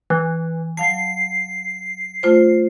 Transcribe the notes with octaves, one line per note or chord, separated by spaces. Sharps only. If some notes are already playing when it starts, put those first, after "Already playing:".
E3
F#3 F5 A5 C7
A3 F4 C5